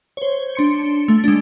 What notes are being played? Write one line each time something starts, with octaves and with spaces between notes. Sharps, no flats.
C5 C#5
D4 C6 C#7
A3
G#3 D4